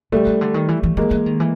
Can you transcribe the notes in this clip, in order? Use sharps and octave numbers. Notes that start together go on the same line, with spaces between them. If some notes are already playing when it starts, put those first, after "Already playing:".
C#3 G3 A3
C#3
D3
D#3
E3
E3
E3 G#3 A#3
E3
D#3
E3